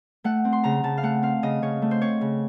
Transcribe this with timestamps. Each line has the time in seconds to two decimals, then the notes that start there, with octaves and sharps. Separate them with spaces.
0.24 A3 F#5
0.45 C4
0.52 C6
0.64 C#3 A#5
0.84 C#3 A5
0.97 F5
1.03 A3 F#5
1.23 C4 F5
1.43 C#3 D#5
1.62 C#3 C#5
1.82 A3
1.91 C5
2.02 C4 C#5
2.21 C#3